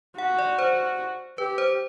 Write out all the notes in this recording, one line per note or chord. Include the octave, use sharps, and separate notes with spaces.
F#4 F#5
D5
C5
G4 B4
C5